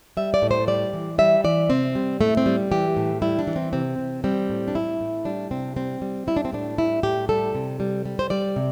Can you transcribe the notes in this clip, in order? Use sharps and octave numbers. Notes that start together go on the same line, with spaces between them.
G3 E5
D5
A2
C5
G3 D5
E3
G3 E5
E3 D5
C3 C4
G3
A2 A3
C4
G3
E3 G4
A2
G3 E4
D4
E3
C4
C3 C4
C3
G3 C4
A2
D4
A2 E4
A2
G3 D4
C3 C4
G3 C4
G3
G3 E4
D4
C4
A2 D4
G3 E4
A2 G4
G3 A4
C3
G3
G3
C5
G3 D5
C3